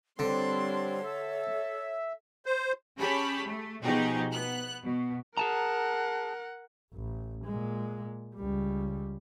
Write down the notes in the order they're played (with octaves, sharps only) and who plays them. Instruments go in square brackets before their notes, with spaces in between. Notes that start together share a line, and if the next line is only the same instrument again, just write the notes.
[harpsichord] D3 [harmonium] G3 C4 [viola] D4 C6 [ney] C#5
[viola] A4 [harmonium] E5
[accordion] C5
[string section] C#4 G4 G#4 A5 B5
A3
B2 F3 D#4 G4 G#4
B3 F#6
B2
[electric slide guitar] G#4 A5 A#5 [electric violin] A#4 F#5
[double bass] A1
A#2 G#3
C#2 G3